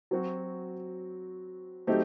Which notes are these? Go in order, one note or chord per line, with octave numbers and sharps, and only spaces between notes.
F#3 C4 F#4
F#3 A3 C4 D#4 G4